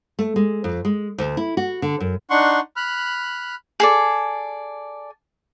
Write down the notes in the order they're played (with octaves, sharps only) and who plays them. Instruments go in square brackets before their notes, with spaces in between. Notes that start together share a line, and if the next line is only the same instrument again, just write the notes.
[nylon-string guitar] A3
G#3
F2
G#3
D2
E4
F#4
D3
F#2
[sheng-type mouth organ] D4 D#4 F#5 C6 C#6
B5 F6 F#6
[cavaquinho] G#4 A4 D5